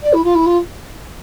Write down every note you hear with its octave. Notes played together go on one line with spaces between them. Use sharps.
D5
E4
F4
E4
F4